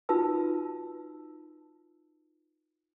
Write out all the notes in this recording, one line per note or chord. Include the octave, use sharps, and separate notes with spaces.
D#4 F4 F#4 B4 A5 E6